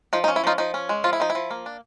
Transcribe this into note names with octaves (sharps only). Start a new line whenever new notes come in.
F3 D#4
D#4
C#4
E4
F3 D#4 F4
F3 D#4
C#4
G#3
F3 F4
E4
F3 D#4
E4
F3
A#3
D4